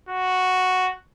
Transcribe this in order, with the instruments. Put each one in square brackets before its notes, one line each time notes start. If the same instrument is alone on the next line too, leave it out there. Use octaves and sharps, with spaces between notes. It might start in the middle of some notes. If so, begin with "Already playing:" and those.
[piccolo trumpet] F#4